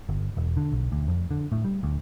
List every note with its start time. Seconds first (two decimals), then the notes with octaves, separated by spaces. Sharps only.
0.09 G1
0.37 E1
0.57 D3
0.72 B1
0.92 D2
1.08 F2
1.31 D3
1.52 A2
1.65 G3
1.83 D2